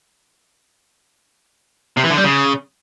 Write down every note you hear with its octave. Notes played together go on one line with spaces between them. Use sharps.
C3
E3
D3
G3
C#3